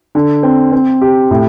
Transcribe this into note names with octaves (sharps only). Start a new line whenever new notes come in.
D3
C4
C4
G4
A2